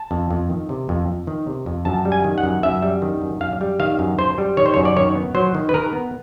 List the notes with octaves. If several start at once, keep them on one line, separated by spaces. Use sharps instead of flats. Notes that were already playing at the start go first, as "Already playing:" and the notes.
Already playing: A5
F2
F2
D#3
C3
F2
F2
D#3
C3
F2
F#2 A5
G3
G#5
D#3
F#5
F#2
F#2 E5
G3
D#3
F#2
F#2 F5
G3
D#3 F5
F#2
F#2 C5
G3
D#3 C#5
C5
C#5
F#2
D5
D#3 C#5
B3
F#3 C5
D#3
B4
D#3 A#4
B3